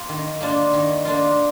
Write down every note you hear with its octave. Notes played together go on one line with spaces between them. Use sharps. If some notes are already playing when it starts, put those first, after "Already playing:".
Already playing: A#3 F4
D#3
A#3 D4 F4
D#3
A#3 D4 F4